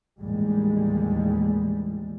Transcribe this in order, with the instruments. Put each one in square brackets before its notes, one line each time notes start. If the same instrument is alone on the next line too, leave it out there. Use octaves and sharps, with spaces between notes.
[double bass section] A1 D#2 G3 G#3